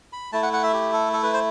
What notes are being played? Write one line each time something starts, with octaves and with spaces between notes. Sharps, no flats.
B5
A3 E4 A5
F#5
F#5
E5
G4
A4
A4
B4
C5